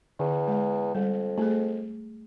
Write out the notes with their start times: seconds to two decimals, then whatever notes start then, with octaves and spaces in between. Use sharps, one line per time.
0.19 E2 D3
0.48 G#3
0.95 F2 G3
1.38 A3 G#4